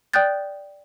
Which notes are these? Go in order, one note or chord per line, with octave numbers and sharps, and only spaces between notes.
D5 G5 D#6 F#6 G6 A6